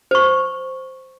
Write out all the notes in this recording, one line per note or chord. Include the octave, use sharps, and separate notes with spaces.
C5 C#6